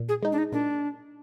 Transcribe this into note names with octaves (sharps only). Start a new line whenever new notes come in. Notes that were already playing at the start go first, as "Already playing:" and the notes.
Already playing: A#2
G#4
G#3 D#4
D4
D#4
A#2 D4